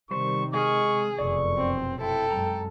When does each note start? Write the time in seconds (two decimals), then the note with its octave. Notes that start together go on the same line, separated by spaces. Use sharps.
0.11 C3 D#3 G3 C5 C#6
0.53 G#3 G#4 D#5 C#6 F6
1.19 F1 F#2 B2 A4 D5 C#6
1.57 C4
2.01 E4 A4 G5
2.31 F#2 G#3 A#5